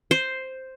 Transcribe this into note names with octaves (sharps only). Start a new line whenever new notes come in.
C5